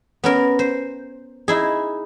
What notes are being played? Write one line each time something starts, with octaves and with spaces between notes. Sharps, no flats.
B3 C#4 A#4
C5
D#4 E4 G#4